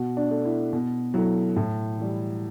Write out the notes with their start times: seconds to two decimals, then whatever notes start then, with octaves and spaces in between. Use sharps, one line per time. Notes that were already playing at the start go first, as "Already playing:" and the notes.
Already playing: B2 F#4
0.17 D4
0.31 A3
0.45 E4
0.73 B2
1.14 F#3 A3 E4
1.56 A2
1.98 E3 G3